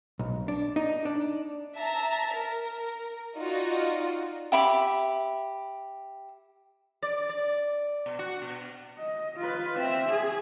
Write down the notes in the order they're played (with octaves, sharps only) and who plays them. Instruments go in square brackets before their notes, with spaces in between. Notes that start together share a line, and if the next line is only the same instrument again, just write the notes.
[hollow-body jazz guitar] B1
D4
D#4
D4
[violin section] E5 A5 A#5
A#4
D#4 F4 F#4 D5 D#5
[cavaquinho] G4 E5 B5 D6
[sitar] D5
D5
B2
F#4
B2
[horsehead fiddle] D#5
F4 B4
C4 E5
G#4